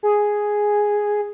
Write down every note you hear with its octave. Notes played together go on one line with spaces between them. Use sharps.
G#4